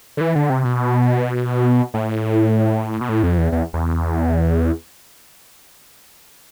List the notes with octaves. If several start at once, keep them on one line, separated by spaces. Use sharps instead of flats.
D3
E3
D3
C3
B2
A2
B2
A2
F2
E2
E2
E2